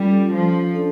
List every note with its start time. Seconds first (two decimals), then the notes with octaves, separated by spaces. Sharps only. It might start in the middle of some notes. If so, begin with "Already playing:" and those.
Already playing: G3 C#4 F4 A4
0.32 F3
0.73 D4 A4 D5